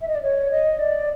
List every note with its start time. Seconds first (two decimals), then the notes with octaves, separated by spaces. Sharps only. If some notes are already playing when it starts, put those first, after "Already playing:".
0.01 E5
0.07 D#5
0.15 D5
0.22 C#5
0.50 D#5
0.79 D5